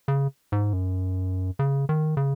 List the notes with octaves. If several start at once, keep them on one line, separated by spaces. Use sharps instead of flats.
C#3
G#2
F#2
C#3
D#3
C#3